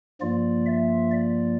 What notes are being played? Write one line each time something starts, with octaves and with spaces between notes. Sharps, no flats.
G2 F3 A#3 F4 D5
E5
D5